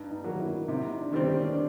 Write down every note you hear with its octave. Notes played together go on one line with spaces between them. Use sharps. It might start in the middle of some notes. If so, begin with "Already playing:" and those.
Already playing: G2 D#4
D#4
D#3 F#3 A#3
E4
C3 D#4
D4
D#3 G3 C4
C#4
D4